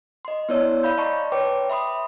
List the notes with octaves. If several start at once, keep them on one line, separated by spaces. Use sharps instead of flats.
D#5 C6
B3 E4 C#5 D5 E6
D5 F5 B5 G6
D5 D#5 A5 A#5 C6 C#6
B4 C#5 G5 D6
E5 B5 C6 D#6